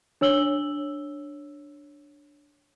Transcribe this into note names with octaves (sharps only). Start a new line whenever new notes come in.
D4 C#5 E6 F#7 G7